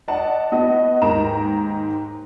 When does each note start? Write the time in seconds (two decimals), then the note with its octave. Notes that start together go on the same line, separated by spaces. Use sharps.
0.08 D5 D#5 F#5 A5
0.52 B3 F#4 D#5
1.01 D#2 G#2 A#4 A#5 E7